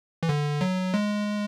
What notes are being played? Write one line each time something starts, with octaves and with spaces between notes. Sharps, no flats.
E3
D3
F#3
G#3